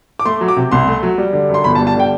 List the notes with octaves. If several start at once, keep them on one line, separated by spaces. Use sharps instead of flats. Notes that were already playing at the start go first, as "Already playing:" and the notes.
D6
A3 C6
F#3
D6
C3
C2 C6
A3
F#3
G3
D3
F#2
C6
G1 B5
A5
G3
A5
D3 G5